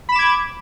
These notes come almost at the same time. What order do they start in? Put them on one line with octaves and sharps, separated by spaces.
B5 E7 D6 G#6